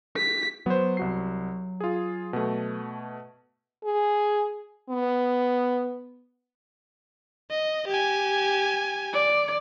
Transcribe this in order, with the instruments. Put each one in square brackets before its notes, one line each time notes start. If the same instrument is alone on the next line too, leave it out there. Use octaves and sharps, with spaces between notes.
[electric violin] B6
[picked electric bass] F#3 [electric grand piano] B3 C5
[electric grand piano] C2 F#4 C7
F4 G#4
B2 A3
[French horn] G#4
B3
[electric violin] D#5
G4 G#5
[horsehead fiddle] D5